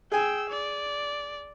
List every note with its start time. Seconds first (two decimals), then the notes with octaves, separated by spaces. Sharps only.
0.12 G#4 G5 G#5 E6
0.50 D5